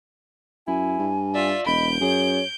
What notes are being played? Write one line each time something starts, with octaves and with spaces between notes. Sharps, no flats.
F#2 E4 G#5
G2
F4 D5 E5
E1 D#5 B5 G6 D7
F#2 G#4 C#5